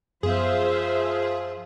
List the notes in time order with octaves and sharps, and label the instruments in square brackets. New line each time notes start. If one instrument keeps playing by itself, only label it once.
[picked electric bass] F#2 B3 [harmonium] F3 F4 [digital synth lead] G#4 [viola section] C5 E5 F5